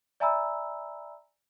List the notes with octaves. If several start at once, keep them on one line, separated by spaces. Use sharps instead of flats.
D5 E5 G#5 A#5 B5 E6